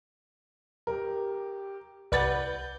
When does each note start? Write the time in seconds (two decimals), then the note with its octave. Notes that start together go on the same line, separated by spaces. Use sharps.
0.87 G4 A#4
2.12 C2 B4 D5 F#5 G6 A6